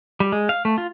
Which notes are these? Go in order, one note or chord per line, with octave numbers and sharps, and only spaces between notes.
G3
G#3
F5
A3
F4